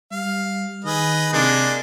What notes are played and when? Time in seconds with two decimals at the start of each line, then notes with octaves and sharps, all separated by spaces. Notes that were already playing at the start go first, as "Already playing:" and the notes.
0.12 G3 F5
0.85 D#3 G#4 B4 D#5
1.33 C3 G#3 A#3 D4